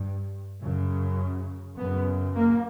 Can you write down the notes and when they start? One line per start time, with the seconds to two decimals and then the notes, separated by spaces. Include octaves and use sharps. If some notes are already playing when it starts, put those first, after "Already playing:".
Already playing: G2
0.62 F#2 C#3
1.77 F#2 C#3 B3
2.35 A#3